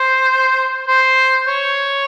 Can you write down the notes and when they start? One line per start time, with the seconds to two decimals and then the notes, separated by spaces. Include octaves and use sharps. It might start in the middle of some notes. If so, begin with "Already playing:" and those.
Already playing: C5
0.87 C5
1.48 C#5